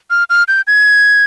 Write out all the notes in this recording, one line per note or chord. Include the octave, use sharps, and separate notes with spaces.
F6
F6
G6
G#6